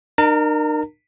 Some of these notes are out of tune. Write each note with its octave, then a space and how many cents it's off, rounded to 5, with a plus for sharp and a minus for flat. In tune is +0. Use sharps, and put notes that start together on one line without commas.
D#4 -45 A#4 +0 A#5 -40